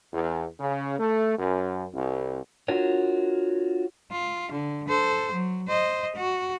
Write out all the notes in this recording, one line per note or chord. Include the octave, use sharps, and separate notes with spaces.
E2
C#3
A3
F#2
C2
D4 F4 F#4 A#4 C#5
F4
D3
A4 C5
F#3
C5 D#5
F#4